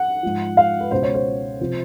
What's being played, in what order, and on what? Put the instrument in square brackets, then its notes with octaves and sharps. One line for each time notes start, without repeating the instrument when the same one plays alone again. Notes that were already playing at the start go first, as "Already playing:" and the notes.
Already playing: [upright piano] F#5
G#2 F3
F5
B4
C#2 B2 C5
C#5
C5
C3 F3